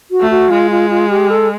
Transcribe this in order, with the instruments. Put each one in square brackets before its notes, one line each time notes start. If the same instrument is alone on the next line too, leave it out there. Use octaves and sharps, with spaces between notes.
[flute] F#4
[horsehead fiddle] A3
[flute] F#4
[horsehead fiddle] G#3 [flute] F4
[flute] F4
F4
G4
A4